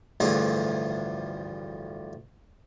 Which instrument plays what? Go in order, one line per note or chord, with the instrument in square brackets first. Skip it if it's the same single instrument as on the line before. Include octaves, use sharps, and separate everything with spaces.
[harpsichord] A1 D2 G2 D3 F3 G#4